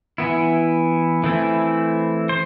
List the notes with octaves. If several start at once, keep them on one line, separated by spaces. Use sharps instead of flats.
E3 B3 E4
E3 A3 C4 E4
C5